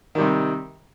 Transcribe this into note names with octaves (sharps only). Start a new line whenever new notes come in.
C3 D#3 G3